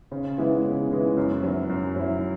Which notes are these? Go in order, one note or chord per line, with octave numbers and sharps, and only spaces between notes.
C#3
E3 G#3 B3 E4
C#3
E3 G#3 B3 E4
F#2
F#3 E4
F#2
F#3 E4